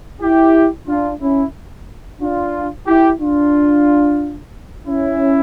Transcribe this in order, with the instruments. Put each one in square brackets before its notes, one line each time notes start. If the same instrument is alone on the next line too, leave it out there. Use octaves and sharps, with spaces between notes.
[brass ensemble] E4 G4
D4 F4
C#4 E4
D4 F4
E4 G4
D4 F4
C#4 E4